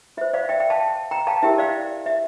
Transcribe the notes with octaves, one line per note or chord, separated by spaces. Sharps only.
F4 C5 E5
D5 F5
E5 G5
E5 G5
F5 A5
G5 A#5
F5 A5
E4 G4 A#4 E5 G5
D5 F5
E5